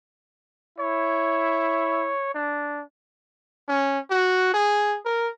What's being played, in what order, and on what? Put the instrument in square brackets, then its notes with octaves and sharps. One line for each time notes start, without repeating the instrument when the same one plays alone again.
[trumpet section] E4 [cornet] C#5
[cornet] D4
[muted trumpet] C#4
F#4
G#4
A#4